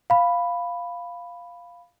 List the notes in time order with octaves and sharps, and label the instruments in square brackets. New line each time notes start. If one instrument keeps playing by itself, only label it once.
[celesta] F5 B5